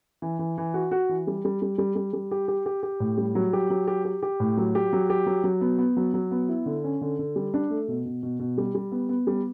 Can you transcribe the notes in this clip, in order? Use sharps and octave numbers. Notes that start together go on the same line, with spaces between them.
E3
E3
E3
F#4
F#4
E3
G3
G3
G3
G3
G3
G3
G4
G4
G4
G4
A2
G3
F#3
G4
F#3
G4
G4
G4
A2
F#3
G4
F#3
G4
F#3
F#3
B3
B3
F#3
F#3
B3
E4
D3
C#4
D3
D3
G3
D4
A3
B2
B2
B2
B2
G3
G3
B3
B3
G3